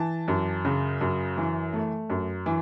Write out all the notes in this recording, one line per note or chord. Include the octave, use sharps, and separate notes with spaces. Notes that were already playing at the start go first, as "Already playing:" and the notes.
Already playing: E3 A5
F#2
C#3
F#2
E3
A3
F#2
E3